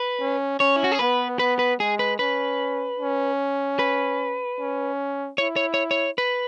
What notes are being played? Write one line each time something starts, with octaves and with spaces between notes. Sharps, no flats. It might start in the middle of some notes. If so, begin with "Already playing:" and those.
Already playing: B4
C#4
C#4 C#5
E4
F#4
G#4
B3 B4
B3 B4
B4
G#3 G#4
B4
C#4 B4
C#4
B4
C#4
E4 C#5
C#5
C#5
C#5
B4